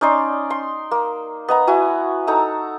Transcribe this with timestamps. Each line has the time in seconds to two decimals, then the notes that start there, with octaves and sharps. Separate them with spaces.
0.01 C#4 D#4 D5 C6
0.50 C6
0.91 A#3
1.48 B3 D#5 A#5
1.67 E4 F#4 G#5
2.27 D#4 A4 A#5 E6